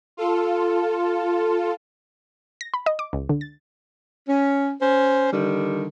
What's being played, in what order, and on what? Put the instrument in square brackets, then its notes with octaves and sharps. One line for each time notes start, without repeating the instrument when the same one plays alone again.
[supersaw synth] F4 A4
[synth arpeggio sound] A#6
B5
D#5
D6
C#2
D3
A6
[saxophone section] C#4
C#4 C5
D3 D#3 G3